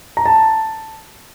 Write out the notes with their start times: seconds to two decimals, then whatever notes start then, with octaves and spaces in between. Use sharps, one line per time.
0.17 A#5
0.26 A5